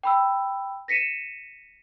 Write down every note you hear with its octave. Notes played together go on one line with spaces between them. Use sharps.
G5 B5 E6
A#6 B6 C#7 D#7 E7